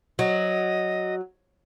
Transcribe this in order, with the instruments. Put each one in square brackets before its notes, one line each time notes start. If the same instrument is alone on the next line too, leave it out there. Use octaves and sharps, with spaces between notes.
[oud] F#3 [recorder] D#5